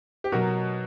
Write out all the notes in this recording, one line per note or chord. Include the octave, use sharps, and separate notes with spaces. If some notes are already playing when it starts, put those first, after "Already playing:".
G4
B2 F#3 F#4 A#4